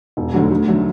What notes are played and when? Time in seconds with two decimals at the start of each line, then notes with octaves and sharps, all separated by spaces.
0.17 E1
0.34 D2 D3 F#3
0.50 D2
0.68 D3 F#3 A3